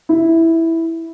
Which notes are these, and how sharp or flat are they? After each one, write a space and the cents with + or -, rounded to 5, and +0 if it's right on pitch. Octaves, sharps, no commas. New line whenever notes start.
E4 -5